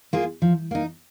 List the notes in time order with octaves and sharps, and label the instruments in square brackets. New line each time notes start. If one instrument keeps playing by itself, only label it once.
[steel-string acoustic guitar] A#3 F4 G#4
F3
A#3 D#4